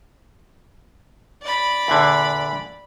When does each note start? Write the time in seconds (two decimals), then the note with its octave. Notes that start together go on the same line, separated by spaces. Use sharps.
1.42 D5 B5
1.88 E2 A#2 D3